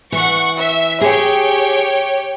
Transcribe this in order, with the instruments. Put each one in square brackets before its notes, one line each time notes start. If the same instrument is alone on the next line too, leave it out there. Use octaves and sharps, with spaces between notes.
[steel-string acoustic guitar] E3 [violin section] F#5 C#6
[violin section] E5
[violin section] G4 C#5 G5 [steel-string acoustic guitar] G#4